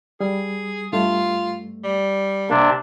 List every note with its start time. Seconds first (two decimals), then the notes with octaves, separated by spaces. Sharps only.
0.20 G3 G#4
0.93 G2 A3 F4
1.84 G3
2.50 C3 A#3 D4